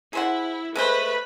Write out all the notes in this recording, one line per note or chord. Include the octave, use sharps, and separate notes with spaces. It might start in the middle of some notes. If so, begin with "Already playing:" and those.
E4 G#4 C5 F#5
G#3 A3 B4 C5 B5